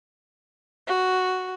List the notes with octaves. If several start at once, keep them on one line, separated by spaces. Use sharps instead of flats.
F#4